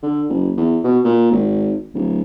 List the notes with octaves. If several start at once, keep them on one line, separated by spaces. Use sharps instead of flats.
D3
F#1
E2
B2
A#2
G#1
D1